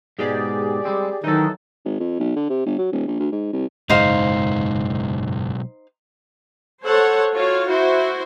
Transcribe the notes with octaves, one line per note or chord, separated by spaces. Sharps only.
G#2 B2 G#3 G4 G#4 D5
G3 G#3 C4
D#3 E3 F#3 D#4 A4
G#1
F2
B1
D3
C3
G1
F#3
D#1
A#1
D2
G#2
C2
F#1 B1 G#2 G#3 D#4 C5 F5
A4 C5 C#5 F#5
F4 F#4 C#5 F5
E4 F#4 C5